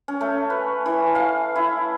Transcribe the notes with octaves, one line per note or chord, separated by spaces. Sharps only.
C#4
A3
B4
E3
F5
E4